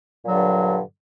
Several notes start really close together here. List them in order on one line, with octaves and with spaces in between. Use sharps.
A#2 F#3 D3 G2